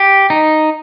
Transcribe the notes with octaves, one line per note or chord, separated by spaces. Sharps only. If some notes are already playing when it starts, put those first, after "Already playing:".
Already playing: G4
D#4